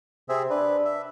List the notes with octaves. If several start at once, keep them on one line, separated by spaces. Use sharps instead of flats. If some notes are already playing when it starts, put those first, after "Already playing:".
C3 C4 G#4 E5
D4 B4
E5